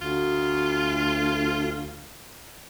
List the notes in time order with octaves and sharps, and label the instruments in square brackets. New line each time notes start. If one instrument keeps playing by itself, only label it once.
[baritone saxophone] D2 [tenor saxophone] F4